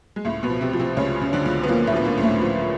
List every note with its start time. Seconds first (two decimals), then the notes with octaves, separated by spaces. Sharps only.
0.16 G#3
0.25 C#2 A2 A3
0.43 B2 B3
0.49 F3
0.61 C3 C4
0.73 F3
0.80 C3 C4
0.97 C#2 C#3 C#4
1.21 C#3
1.33 D3 D4
1.46 C#2
1.63 B3
1.69 A#2 F3 A#3
1.87 A2 A3
1.93 F3 B3
2.05 A#2 A#3
2.18 C#2
2.23 A2 A3
2.41 F3